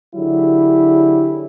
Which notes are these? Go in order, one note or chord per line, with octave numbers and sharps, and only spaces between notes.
D3 F#3 E4 G4 G#4